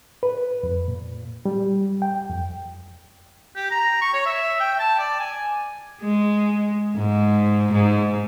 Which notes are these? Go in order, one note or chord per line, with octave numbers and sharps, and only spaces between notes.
B4
F2
A#2
G3
G5
F2
G4
A#5
C#6
C#5
E5
G5
A5
D5
G#5
G#3
G#2
G#2